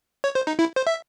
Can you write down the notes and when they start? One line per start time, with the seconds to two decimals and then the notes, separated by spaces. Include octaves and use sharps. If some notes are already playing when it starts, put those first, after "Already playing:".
0.24 C#5
0.35 C5
0.47 D#4
0.59 E4
0.76 C5
0.87 E5